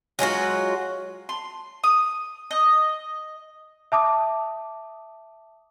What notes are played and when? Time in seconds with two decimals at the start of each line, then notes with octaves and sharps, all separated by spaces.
0.19 F#3 G#3 F4 F#4
1.29 C6
1.84 D#6
2.51 D#5
3.92 E5 A5 D6 D#6